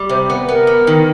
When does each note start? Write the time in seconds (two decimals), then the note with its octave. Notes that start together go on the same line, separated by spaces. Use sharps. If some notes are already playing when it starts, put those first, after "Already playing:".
Already playing: G3
0.09 C3 C5
0.30 B3
0.49 B3 A#4
0.67 B3
0.87 D#3